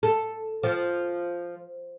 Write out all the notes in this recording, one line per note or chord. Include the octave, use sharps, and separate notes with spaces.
A4
F3